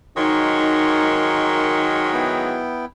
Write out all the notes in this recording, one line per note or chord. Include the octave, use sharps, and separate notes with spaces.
G#2 D#3 F#3 D#4 A#4 C6 C#6
B3 E4 G5